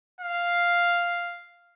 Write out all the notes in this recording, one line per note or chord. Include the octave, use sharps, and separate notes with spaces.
F5